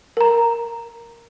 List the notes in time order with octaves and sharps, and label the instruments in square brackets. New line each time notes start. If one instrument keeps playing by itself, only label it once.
[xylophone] A#4 A#5